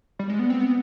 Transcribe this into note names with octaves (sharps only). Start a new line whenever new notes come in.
G3
G#3
B3
C4
B3